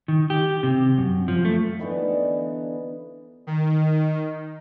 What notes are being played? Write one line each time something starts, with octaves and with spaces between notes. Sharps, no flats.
D#3
G4
C3
F#2
F3
A3
D3 E3 B3 D#4
D#3